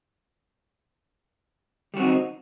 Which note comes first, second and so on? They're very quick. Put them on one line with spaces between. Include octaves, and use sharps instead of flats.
G3 F#4 C4 D#4